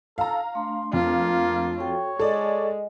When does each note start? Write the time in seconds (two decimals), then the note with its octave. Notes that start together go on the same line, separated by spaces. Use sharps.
0.18 A4 F5 A#5
0.55 A3 D4 C6
0.93 F2 A#3 F4
1.78 F#4 A4 C#5 G5
2.19 G#3 A4 D5 D#5